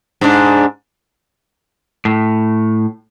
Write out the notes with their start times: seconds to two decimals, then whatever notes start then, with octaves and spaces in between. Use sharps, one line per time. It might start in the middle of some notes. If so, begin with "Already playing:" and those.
0.21 G#2 D4
2.05 A2